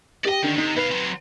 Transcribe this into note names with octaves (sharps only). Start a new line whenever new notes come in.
G4 D5 D#5 G5
D3 D#3
C3 D#4
B2 B4 F5
F#3 C4